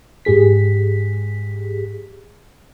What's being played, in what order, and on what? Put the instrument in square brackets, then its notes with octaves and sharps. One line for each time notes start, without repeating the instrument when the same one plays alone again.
[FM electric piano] G#2 G4 G#4 B6